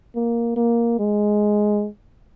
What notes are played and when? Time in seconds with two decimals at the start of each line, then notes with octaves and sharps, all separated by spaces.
0.15 A#3
0.56 A#3
0.99 G#3